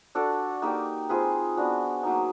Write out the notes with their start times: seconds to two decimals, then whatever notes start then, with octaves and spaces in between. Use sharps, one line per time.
0.15 D4 F#4 A4 D5
0.62 A#3 D#4 G4
1.09 C4 F4 G#4 B4
1.57 B3 D4 F#4
2.03 F#3 A#3 D#4